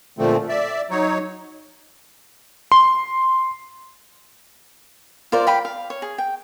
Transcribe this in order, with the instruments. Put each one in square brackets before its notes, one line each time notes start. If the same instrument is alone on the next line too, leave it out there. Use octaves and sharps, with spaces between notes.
[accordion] A#2 D3 F3 A3 C4
D5 E5
F#3 D#4 C#5
[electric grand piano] C6
[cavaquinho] F4 A#4 C5 D5
F5 G5 B5
F5
C#5
G#4
G5